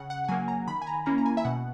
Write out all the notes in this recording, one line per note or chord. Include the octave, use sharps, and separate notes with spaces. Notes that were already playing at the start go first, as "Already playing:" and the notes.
Already playing: C#3 F#5
F#5
F#5
F#3 A#3 G#5
A#5
D#3 B5
G#5
A#5
A#3 C#4 E4 A#5
A#5
G#5
E5
B2 F#5